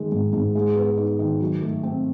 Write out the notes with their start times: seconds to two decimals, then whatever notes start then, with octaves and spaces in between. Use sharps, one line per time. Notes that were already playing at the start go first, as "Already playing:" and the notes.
Already playing: D#3 G#3
0.12 G#2
0.33 G#2
0.55 G#3
0.76 B3
0.98 D#4
1.19 D#3
1.40 F#3
1.62 A3
1.83 C4